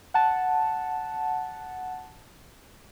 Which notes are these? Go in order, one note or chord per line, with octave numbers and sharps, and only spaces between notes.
F#5 A5